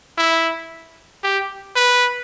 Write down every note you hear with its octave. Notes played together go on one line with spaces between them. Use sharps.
E4
G4
B4